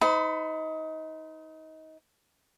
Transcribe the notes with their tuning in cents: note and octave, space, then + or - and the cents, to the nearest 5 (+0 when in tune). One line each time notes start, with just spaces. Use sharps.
D#4 +25 C5 -35 B5 +25